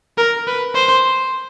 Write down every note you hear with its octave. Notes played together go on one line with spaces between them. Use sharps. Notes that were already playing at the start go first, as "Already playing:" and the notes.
A#4
B4
C5